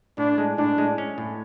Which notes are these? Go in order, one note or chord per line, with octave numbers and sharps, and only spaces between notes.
A2 D4
G#3
A2 D4
G#3
C#4
A2